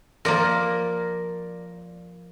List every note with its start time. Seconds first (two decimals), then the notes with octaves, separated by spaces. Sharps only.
0.25 F3 A#3 A#4 D5